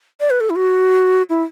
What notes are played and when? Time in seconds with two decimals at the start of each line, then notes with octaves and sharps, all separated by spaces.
0.20 D5
0.30 B4
0.40 A4
0.50 E4
0.56 F#4
1.30 E4